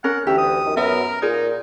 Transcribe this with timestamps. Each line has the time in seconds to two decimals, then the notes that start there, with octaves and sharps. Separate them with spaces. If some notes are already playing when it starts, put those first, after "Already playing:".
0.04 C#4 A#4 F#5
0.27 D2 E3 G4 E5
0.38 D#6
0.65 F#2 D#3
0.77 F#2 B3 A#4 E5
1.22 A#2 D#4 G#4